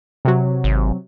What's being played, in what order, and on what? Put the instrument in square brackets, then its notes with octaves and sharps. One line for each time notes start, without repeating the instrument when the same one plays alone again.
[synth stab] C3 F#3
[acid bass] G#1